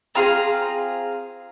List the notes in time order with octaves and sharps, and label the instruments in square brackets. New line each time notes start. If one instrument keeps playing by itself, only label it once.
[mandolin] C4 F4 G#4 A#5